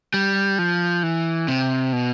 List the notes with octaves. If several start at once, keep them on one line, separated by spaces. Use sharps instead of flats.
G3
F3
E3
C3
B2